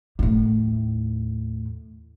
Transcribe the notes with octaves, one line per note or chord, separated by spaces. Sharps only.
D#2 A2